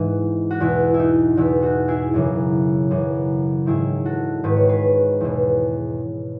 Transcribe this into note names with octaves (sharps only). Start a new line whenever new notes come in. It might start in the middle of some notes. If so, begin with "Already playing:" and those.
Already playing: G#2 E3 D#4
F#4
E2 B2 E4
E4
D#4
E2 B2 E4
D#4 F#4
E4 G#4
F#2 C#3 E3 E4
F#2 C#3 E3
G#2 D#3 E4 G#4
F#4 A4
G#2 D#3 B4
C#5
G#4 B4
E2 B2